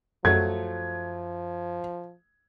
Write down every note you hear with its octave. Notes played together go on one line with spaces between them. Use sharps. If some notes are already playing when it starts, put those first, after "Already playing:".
F#2 F3 F#3 A3 G#6